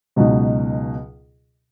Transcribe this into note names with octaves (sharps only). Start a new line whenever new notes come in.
C#2 B2 F#3 D#4